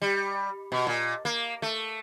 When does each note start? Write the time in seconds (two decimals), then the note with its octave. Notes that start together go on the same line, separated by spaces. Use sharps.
0.02 G3
0.72 B2
0.87 A#2
1.25 A#3
1.62 A3